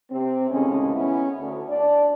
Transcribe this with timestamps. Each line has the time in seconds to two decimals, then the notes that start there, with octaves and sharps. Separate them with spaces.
0.11 C3 C4
0.50 D#2 A2 C#3 G#3 C#4
0.93 B3 C#4 E4
1.38 D2
1.69 D4 D5